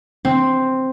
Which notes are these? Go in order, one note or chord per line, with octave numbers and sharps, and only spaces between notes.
C4